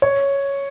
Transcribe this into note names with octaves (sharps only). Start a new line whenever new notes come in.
C#5